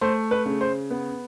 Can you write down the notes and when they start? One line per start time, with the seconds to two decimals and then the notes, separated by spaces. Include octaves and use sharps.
0.01 A3 C5
0.31 B4
0.46 C#3
0.61 C5
0.91 B3